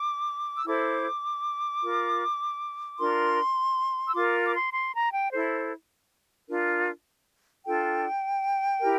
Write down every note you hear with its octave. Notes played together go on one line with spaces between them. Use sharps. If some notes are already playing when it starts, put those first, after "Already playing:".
Already playing: D6
E6
E4 A4 C5 D6
F4 A#4
D4 F4 A#4 C6
E6
F4 A#4 D6
D6
C6
C6
A#5
G5
E4 A4 C5
D4 F4 A#4
D4 F4 A4 G5
E4 G4 A#4